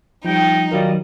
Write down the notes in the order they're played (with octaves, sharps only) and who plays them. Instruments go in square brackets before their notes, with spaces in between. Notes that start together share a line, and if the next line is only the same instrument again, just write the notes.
[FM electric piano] F3 G3 [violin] D#4 [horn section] G5
[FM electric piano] D#3 F#3 A#4 [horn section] G3 F4 D#5